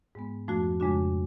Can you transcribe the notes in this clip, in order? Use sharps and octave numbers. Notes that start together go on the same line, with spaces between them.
G#2 G#3 B3
F2 F3 A3 D4 F#4
F2 C#3 G#3 D4 F#4